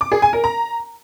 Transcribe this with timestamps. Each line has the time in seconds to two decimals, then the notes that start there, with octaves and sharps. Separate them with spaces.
0.01 D6
0.12 G#4
0.22 G#5
0.33 A#4
0.44 A#5